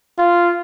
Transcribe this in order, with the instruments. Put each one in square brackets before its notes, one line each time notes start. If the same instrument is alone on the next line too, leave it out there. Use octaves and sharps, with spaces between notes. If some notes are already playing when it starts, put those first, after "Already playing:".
[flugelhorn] F4